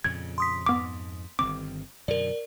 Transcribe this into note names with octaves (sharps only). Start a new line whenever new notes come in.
F2 A#2 C#3 G#6
C6 D#6 B6
F2 G#2 B3 D6
G1 D#3 C4 D6
F#2 B2 D3 A#4 D5